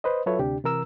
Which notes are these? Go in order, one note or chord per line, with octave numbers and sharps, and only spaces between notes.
B4 C5 D#5
F#3 F4 A4 B4 C#5 E5
D2 C3 D4 G4
C3 E3 A#4 E6